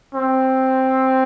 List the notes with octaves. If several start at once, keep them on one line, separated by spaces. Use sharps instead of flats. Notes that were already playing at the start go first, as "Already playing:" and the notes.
C4